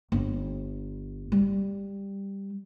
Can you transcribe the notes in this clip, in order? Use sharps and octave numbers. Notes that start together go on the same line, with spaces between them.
G1
G3